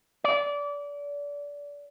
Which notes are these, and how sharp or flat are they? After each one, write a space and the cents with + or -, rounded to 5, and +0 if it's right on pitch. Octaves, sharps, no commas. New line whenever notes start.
D5 -25